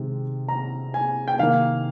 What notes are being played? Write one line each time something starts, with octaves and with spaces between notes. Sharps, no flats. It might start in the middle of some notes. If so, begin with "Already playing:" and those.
Already playing: C3 D#3 G#3
A#5
G#5
G5
C3 D#3 A#3 F5